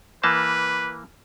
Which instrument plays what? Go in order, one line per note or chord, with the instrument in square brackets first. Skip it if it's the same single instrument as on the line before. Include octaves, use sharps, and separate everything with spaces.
[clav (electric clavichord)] E3 A#3 A5 [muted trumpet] B4